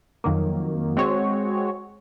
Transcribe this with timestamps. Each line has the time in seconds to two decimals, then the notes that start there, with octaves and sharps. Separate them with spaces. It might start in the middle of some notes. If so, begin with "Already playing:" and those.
0.24 F2 D#3 F#3 A#3
0.97 G#3 C4 F#4 C#5